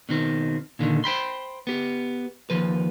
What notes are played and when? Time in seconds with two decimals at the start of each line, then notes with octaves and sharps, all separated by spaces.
0.09 B2 D#3 C4
0.79 A#2 D3 D#3
1.04 C5 G5 B5 C6
1.67 B3 G4
2.50 D#2 F3 B4